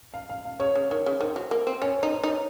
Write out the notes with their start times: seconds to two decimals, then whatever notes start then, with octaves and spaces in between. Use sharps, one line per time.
0.14 F5
0.30 F5
0.45 F5
0.60 C#3 C#5
0.75 C#3
0.90 D#3 C#5
1.06 C#3
1.21 D#3 C5
1.36 F#3
1.51 A#3
1.67 C4
1.82 C#4 C#5
1.97 C5
2.03 D#4
2.13 C5
2.24 D#4
2.28 C#5